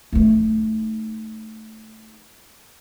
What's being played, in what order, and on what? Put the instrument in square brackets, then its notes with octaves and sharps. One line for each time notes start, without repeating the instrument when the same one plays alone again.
[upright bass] A3 D#4